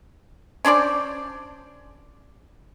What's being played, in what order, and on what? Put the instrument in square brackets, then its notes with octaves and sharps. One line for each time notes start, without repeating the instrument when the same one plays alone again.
[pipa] C#4 D4 C5 D5